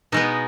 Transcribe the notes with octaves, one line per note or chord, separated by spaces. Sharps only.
B2 G#3 B3 D#4